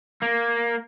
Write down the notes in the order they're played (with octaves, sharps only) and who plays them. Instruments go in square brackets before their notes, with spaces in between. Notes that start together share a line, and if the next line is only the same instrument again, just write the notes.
[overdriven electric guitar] A#3